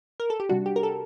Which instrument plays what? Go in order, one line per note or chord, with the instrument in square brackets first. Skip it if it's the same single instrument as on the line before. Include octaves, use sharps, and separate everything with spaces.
[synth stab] A#4
A4
G4
C3 G3 D4 F#4
G4
A#4
A4